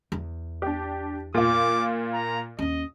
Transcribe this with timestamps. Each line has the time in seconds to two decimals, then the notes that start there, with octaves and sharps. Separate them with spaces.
0.12 E2
0.62 D4 G4
1.34 A#2 F4 D6
2.14 A#5
2.59 D#2 C#4 D#5